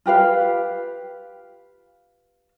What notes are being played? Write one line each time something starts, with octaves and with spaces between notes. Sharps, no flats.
F4 G4 B4 F5